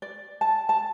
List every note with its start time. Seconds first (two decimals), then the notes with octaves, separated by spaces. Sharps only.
0.02 D5
0.41 A5
0.69 A5